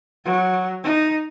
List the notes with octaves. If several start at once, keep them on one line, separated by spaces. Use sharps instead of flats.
F#3
D#4